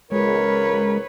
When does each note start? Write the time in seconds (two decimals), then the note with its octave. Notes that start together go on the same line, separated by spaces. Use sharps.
0.12 C#2 G#3 A#4 B4 C#5